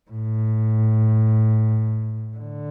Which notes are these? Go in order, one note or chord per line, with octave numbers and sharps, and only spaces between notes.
A2
D3